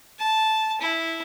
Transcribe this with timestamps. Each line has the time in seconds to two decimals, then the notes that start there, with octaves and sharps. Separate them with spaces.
0.19 A5
0.81 E4